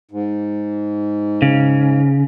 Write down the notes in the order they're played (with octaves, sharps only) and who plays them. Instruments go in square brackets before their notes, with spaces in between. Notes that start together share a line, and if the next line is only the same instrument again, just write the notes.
[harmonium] G#2
[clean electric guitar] C#3